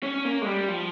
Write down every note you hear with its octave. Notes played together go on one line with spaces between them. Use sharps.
C#4
A#3
G#3
G3
F3